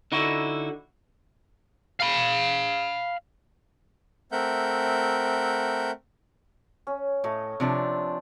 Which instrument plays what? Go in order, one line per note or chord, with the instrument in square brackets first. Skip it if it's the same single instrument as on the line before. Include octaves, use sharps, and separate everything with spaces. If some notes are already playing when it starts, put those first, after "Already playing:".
[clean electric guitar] D3 D#4 E4 F#4
[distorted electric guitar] F5 B5
[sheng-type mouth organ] A3 C4 A#4 E5 F#5 G6
[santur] C#4
[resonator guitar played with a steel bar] A2 [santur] A3 D#5 D#6
[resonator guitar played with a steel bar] C3 F3 D4